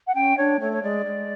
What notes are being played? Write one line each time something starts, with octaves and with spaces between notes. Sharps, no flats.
F#5
C#4 G5
D4 C#5
A3 C#5
C#5
G#3 D5
G#3